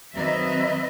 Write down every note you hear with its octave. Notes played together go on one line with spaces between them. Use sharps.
D#3 F#3 C4 B4 D#5 E5